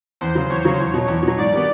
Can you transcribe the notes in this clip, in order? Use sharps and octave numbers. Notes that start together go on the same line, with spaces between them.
E2 C5
C#3 F#3
E2 C#5
C#3 F#3
E2
B2 F#3
E2
B2 F#3
G#2 D5
D#3 G3 B3